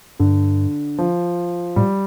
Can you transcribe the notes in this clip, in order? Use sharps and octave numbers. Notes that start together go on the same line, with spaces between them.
G2 D3
F3
A2 G3